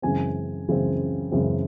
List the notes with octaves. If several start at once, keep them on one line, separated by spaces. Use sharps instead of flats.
F#2 C#3 E3 G#3 C4 G#5
F#2 C#3 E3 G#3 C4
F#2 C#3 E3 G#3 C4